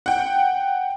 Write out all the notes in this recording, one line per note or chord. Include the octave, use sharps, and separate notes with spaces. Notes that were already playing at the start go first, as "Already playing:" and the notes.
F#5 G5